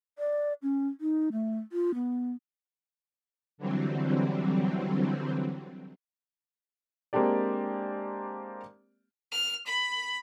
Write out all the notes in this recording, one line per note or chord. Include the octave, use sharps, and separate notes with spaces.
D5
C#4
D#4
A3
F4
B3
D3 E3 F#3 G3 C4
G#3 A#3 C4 D4 G4 D5
F6
B5